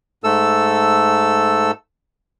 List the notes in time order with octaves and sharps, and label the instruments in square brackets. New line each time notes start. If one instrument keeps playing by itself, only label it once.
[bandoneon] G#2 A3 A4 E6